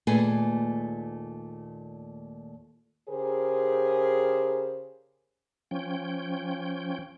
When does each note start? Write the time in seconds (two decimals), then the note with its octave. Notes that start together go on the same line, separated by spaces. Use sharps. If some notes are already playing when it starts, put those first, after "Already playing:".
0.07 D#2 A#2 A3 G#4 B4 G#5
3.09 C#3 G4 G#4 A#4 C5
5.71 F3 C#4 G5